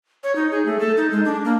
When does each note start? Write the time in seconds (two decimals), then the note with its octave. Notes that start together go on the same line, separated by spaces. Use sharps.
0.24 C#5
0.36 D#4
0.51 G#4
0.66 A3
0.80 A4
0.97 D#4
1.11 G#3
1.25 D4
1.45 A#3